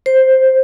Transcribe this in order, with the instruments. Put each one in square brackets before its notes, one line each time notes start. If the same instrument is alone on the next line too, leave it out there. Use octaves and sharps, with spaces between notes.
[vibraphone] C5